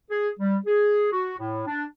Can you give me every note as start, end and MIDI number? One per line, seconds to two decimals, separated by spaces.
0.10 0.29 68
0.40 0.56 55
0.66 1.08 68
1.12 1.38 66
1.38 1.62 45
1.67 1.85 62